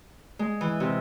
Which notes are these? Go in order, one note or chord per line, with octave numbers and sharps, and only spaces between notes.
G#3
E3
C3